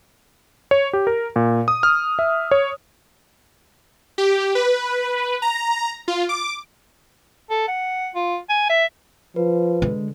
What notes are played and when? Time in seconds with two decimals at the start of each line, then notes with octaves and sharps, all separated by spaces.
0.71 C#5
0.93 G4
1.07 A#4
1.36 A#2
1.68 D#6
1.83 F6
2.19 E5
2.51 C#5
4.18 G4
4.55 B4
5.42 A#5
6.08 F4
6.29 D6
7.50 A4
7.68 F#5
8.15 F4
8.49 G#5
8.70 E5
9.36 F3 B4
9.82 D3 G#3